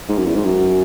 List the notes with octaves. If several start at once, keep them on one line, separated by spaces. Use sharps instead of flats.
G#2
F#2
E2
G#2
F#2